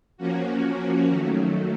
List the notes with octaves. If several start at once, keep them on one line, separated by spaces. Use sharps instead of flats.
F3 A#3 C#4 F#4
D#3 F#3 A3